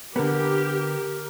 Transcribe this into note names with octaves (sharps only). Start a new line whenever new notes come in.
D3 B3 G4 A#4